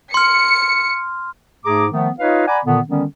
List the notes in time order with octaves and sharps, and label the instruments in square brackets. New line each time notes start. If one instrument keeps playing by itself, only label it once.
[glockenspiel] C6 F6 [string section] C#7
[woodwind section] G#2 A3 G#4 A#5 D6
D#3 F3 A3 B3
D#4 F4 B4 C#5 D#5 F5
D5 F#5 G#5 A#5 B5 D6
A#2 D3 D#3 B3
D3 D#3 G3 B3 C#4